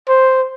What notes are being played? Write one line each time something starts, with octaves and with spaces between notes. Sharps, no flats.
C5